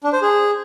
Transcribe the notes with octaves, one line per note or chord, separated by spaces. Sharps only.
D4
C5
G#4